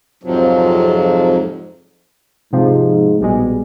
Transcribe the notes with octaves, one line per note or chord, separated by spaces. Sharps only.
F2 G#2 C3 F3 F#3
G#2 C3 F3
A#1 B2 G3 G#3